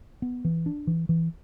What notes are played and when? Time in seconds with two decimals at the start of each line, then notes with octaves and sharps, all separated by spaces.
0.22 B3
0.45 E3
0.66 D4
0.87 E3
1.09 E3